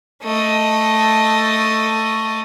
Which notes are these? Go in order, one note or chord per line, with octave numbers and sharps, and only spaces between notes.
A3 D#5